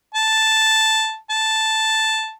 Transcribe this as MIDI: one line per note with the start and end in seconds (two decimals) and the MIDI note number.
0.14 1.17 81
1.30 2.33 81